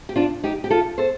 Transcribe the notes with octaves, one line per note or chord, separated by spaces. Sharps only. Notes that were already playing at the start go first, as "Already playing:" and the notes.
G4
D4 F4
D#4 G4
G4
F4 A4
A4 C5